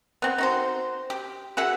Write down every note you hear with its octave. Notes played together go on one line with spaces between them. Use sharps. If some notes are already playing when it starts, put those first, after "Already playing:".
B3 C4
D#4 F#4 C5
G4
F#4 G#4 E5 F#5